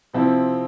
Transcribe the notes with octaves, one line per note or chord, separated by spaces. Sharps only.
C3 F3 C4 E4